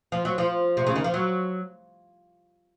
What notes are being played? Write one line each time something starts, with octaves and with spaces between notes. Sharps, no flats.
F3
F#3
F3
C3
C#3
D#3
F3
F#3